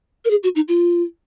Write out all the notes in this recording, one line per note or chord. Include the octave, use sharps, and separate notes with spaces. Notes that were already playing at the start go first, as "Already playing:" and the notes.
A#4
G#4
F#4
D#4
F4